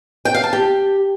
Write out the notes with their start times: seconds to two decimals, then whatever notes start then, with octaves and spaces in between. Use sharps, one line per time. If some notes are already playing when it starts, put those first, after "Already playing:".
0.25 G5
0.34 F5
0.44 A5
0.53 G4